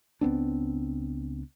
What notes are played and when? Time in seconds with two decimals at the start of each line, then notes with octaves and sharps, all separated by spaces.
0.21 C#2 B3 C4 D4